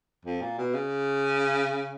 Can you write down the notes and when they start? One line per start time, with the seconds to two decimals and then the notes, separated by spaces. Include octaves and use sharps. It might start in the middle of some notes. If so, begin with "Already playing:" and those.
0.25 F2
0.41 A#2
0.58 B2
0.74 C#3